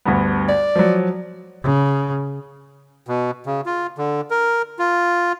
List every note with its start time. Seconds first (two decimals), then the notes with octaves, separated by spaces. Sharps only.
0.05 D2 G2 B3
0.49 D5
0.76 F3 F#3
1.63 C#3
3.07 B2
3.46 C#3
3.66 F4
3.98 D3
4.30 A#4
4.79 F4